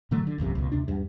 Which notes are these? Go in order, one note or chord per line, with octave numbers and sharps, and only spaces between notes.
A2 D3 F#3 A3
D3
D#1 A#1 F#2 C3
C#2 B2
D#2 C3 D4
E2 G2